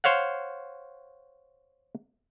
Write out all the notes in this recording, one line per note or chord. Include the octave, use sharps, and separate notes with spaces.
C5 C#5 F5 F#5